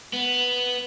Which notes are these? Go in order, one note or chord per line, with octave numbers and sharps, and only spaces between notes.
B3